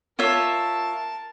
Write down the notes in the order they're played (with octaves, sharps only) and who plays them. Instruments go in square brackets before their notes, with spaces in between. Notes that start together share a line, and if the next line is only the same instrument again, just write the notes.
[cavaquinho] F4 C#5 E5 [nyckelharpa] A#4 A5